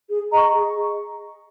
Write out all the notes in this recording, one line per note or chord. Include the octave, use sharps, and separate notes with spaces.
G#4
D#5 A#5 C#6
G#4